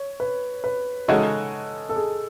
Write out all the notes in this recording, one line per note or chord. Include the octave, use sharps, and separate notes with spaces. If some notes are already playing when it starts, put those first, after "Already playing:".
Already playing: C#5
B4
B4
C#3 G#3 D#4 F#4 A4 C#5
A4
G#4